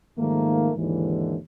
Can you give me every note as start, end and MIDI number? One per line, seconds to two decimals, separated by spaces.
0.18 0.71 44
0.18 0.71 51
0.18 0.71 53
0.18 0.71 57
0.18 0.71 58
0.77 1.37 39
0.77 1.37 44
0.77 1.37 50
0.77 1.37 52